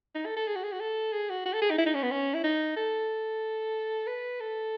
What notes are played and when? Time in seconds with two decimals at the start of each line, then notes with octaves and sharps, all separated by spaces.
0.15 D#4
0.25 A4
0.36 A4
0.48 G#4
0.56 F#4
0.64 G#4
0.72 F#4
0.80 A4
1.13 G#4
1.30 F#4
1.45 F#4
1.53 A4
1.62 G#4
1.70 D#4
1.78 E4
1.86 D#4
1.94 C#4
2.03 B3
2.11 C#4
2.34 E4
2.44 D#4
2.76 A4
4.07 B4
4.40 A4